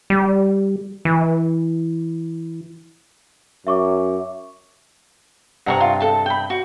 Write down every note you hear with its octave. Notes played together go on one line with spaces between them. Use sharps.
G3
E3
F#2 E5 C#6 D6
G2 C3 F#5 A#5 C#6
F4
A4 A5
G5 B5
F#4